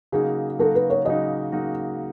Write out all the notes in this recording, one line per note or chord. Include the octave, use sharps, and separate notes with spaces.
C#3 F#3 A#3 D#4 F#4 G#4
C#3 F#3 A#3 D#4 F#4 A4
B4
C#5
C#3 F#3 A#3 D#4 F#4 D#5
C#3 F#3 A#3 D#4 F#4